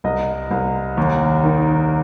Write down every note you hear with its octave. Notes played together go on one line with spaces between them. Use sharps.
C2 D#5
C2
D#2
D#3